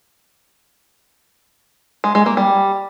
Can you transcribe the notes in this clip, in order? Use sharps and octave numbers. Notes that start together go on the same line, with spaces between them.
G#3
G#3
A#3
G3